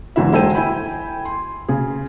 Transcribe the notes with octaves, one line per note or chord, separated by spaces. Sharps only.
F#1 G#2 D3 E3 E4 E5
G#3 E4 A4 C5 G5 D#7
E4 G5 G#5 B5
C6
C#3 G#4